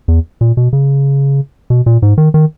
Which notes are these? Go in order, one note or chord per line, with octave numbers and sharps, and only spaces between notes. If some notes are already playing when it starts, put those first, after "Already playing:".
E2
A#2
B2
C#3
B2
A#2
G#2
D#3
D#3